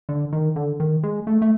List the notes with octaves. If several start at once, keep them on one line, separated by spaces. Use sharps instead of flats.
D3
D#3
D3
D#3
G#3
A3
A3